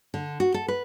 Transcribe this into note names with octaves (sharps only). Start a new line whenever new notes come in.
D3
F#4
A4
B4